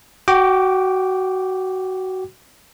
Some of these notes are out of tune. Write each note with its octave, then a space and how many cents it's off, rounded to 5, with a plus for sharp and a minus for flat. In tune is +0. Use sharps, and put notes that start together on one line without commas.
F#4 +15 G5 -10 D6 +0